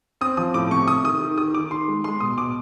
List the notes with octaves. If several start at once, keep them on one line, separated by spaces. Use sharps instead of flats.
C4 D#6
F3 D#6
A2 D6
C3 C#6
C3 D#6
D#3 D#6
D#3
D#3 D#6
D#3 D6
D#3 C6
G#3
G#3 C6
B2 D#6
B2 D6